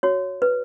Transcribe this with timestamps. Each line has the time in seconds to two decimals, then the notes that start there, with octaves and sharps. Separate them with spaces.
0.03 F#4 C#5
0.42 B4